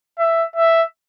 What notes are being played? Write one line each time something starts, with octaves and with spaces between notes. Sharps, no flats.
E5
E5